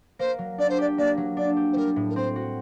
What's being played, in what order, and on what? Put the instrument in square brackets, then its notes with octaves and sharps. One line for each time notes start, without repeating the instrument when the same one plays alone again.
[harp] A#3 [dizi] C5
[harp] F#3
[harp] D4 [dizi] D5
[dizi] C5
[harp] G4 [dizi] D5
[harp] A#3 [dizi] D5
[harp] F#3
[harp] D4 [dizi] D5
[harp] G4
[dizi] C5
[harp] G3 [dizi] A#4
[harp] A2
[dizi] A#4
[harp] C4 [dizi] C5
[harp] F#4